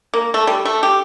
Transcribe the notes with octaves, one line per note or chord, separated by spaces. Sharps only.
A#3
A3
G3
A3
G4